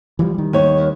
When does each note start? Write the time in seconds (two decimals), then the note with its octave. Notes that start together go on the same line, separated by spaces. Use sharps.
0.19 E3 F3 G3
0.34 D#3 G3
0.53 D#2 C#5